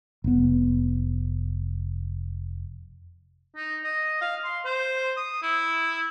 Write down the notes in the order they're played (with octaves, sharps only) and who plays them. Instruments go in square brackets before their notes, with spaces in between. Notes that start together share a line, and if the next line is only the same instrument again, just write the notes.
[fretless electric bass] F1 B3
[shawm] D#4
D#5
F5
C6
C5
D#6
E4